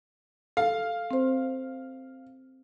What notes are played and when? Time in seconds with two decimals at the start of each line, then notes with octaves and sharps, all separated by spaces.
0.57 A4 F5
1.11 C4 C5